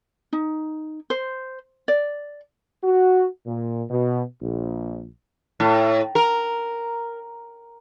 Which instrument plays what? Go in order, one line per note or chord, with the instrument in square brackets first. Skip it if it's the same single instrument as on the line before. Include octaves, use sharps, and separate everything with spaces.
[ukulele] D#4
C5
D5
[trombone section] F#4
A#2
B2
A#1
[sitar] A2
A#4